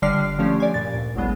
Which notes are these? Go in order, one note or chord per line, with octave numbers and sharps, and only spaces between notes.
G1 D3 G3 D5 F6 C7
D3 F3 A3 C#4 G4 D5
D5 G#5
G2 A#2 A6
D2
A1 D2 F#3 G#3 B3